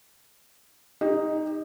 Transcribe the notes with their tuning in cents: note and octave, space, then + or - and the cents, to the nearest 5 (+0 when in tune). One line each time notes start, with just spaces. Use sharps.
D#4 +0 G4 +35